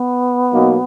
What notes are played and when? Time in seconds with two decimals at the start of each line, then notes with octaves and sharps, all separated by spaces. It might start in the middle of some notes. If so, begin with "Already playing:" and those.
Already playing: B3
0.52 B2 F#3 A#3 D#4